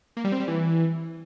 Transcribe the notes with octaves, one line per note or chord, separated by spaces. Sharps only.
A#3
G3
C4
G3
E3